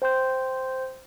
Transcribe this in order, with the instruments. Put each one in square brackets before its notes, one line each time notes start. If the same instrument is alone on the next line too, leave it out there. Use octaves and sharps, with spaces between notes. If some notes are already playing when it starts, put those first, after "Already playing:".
[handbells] C5 G5 C6 G6